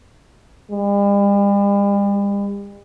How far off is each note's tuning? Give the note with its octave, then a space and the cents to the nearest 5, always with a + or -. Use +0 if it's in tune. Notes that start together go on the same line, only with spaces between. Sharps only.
G3 +45